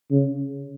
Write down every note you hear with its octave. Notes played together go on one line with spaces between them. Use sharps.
C#3